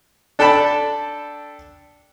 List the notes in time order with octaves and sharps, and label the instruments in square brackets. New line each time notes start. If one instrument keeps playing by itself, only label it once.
[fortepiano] D4 A4 G5 A5 B5